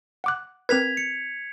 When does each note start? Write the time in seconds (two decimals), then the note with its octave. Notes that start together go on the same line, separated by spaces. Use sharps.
0.24 F#5 D6 F#6
0.69 C4 A#4 B4 G#6 B6 F7
0.97 C#7